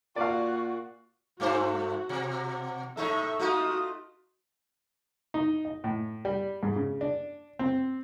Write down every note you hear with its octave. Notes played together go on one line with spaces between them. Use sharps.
A#2 F#4 D5 F5
G2 A3 F#4 C5
B2
A2 D#4 A4 E5 C#6
A3 D#4 F4 F#4 D#6
D#4
D#5
A2
G3
G#2
C#3
D4
C4